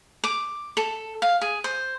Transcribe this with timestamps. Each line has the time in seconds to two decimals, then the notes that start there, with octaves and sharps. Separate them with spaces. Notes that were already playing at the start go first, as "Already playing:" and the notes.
0.24 D6
0.77 A4
1.22 F5
1.41 G#4
1.64 C5